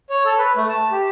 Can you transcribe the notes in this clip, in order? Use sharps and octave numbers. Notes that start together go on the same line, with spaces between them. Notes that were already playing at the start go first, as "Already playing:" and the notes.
C#5
A4
B4
A3
A5
G4